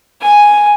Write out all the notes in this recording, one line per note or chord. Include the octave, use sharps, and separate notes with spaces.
G#5